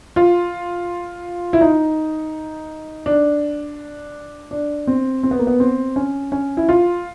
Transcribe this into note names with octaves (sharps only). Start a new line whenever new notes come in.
F4
E4
D#4
D4
D4
C4
C4
B3
A#3
B3
C4
C#4
C#4
E4
F4